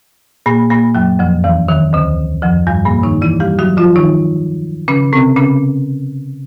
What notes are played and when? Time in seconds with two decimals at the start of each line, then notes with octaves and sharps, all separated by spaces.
0.46 A#2 A#3
0.70 A#2 A#3
0.95 F#2 F#3
1.19 F2 F3
1.44 E2 E3
1.68 D#2 D#3
1.93 D2 D3
2.42 F2 F3
2.67 G2 G3
2.85 A#2 A#3
3.03 D#3 D#4
3.22 E3 E4
3.40 G3 G4
3.59 F#3 F#4
3.77 F3 F4
3.96 D#3 D#4
4.88 C#3 C#4
5.13 C3 C4
5.37 C#3 C#4